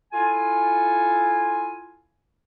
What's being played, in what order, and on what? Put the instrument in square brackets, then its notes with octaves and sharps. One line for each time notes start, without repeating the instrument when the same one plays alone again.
[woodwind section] E4 F4 A4 G#5